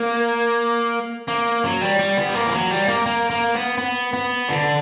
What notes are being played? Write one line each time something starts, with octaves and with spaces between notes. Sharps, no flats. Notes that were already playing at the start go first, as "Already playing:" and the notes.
Already playing: A#3
A#3
F#3
G3
G3
B3
G3
A#3
E3
F#3
G3
A#3
A#3
A#3
B3
B3
B3
D3